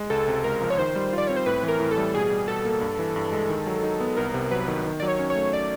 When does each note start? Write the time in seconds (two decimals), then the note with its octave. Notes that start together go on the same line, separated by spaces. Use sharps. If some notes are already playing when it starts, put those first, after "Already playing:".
Already playing: G#3
0.10 C#2 A4
0.28 C3
0.44 C#2 A#4
0.62 F3
0.70 C#5
0.78 D#3 C5
0.96 G3
1.13 F4
1.18 D5
1.27 C4 C#5
1.36 C5
1.46 A2 B4
1.63 E3
1.68 A#4
1.80 A2
1.91 A4
1.97 G3
2.14 B2 G#4
2.31 G3
2.48 B2 A4
2.65 A#3
2.81 G2
2.99 E3
3.16 G2
3.32 G#3
3.49 D#3
3.67 F#3
3.83 D#4
4.00 B3
4.17 C2 A#4
4.34 C3
4.51 F#3 B4
4.68 D#3
4.85 D#3
5.00 D5
5.02 F#3
5.08 C#5
5.19 C#4
5.30 C#5
5.36 A3
5.53 D5